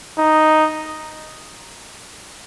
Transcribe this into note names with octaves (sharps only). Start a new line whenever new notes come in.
D#4